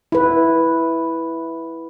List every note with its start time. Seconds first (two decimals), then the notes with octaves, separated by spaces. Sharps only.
0.12 E4 B4